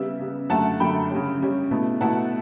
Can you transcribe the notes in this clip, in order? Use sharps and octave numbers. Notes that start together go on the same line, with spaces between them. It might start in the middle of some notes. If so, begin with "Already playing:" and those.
Already playing: C#3 G3 B3 E5
C#3 G3 B3
F#2 D3 A3 F#5 A5
F#2 D3 A3 G5 B5
C#3 G3 C#4
C#3 G3 C#4
B2 A3 E4
B2 A3 E4 F#5 A5